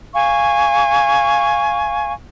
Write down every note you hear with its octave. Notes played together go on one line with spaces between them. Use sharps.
F5 G#5 C#6